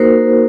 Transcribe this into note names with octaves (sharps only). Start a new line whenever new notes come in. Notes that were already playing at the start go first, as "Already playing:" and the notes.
Already playing: A#3 D#4 F#4 A#4 C5